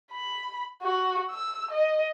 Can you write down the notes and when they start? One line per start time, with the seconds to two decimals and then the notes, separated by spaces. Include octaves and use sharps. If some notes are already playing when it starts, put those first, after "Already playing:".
0.11 B5
0.82 F#4
1.30 E6
1.71 D#5